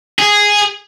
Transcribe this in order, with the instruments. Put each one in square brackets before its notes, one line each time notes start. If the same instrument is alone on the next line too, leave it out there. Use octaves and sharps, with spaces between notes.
[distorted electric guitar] G#4